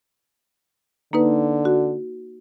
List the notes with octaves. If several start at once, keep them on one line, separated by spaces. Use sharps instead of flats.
D3 A#3 D#4 B4
F#4